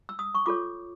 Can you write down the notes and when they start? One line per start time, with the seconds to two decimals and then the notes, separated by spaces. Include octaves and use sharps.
0.09 E6
0.19 D#6
0.35 C#6
0.46 F4 A4 C#5 D6